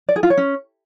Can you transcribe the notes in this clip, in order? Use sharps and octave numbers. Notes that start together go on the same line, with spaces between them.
D5
G#4
F4
C#5
C#4